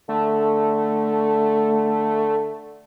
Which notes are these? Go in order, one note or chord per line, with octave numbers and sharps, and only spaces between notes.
D3 A3